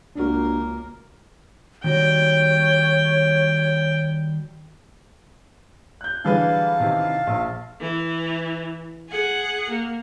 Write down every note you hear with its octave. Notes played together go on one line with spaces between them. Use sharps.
C#2 A#3 D4 F#4 A#4
D#3 G3 F#4 C#5 G5
F#6 G6
D3 E3 F#3 G3 G#4 B4 F5 A5
C3 D#3
A#1
E3
G#4 F#5
A#3